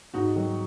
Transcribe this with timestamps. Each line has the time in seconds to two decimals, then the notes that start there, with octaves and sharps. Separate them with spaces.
0.14 G#2 D#4 F#4
0.35 D#3 F#3